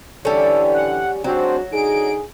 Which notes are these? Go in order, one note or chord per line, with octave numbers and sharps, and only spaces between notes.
D3 E3 G3 C#4 A4
F#5
G#2 F#3 C4 D4 F#4
D3 D#4 G#4 D7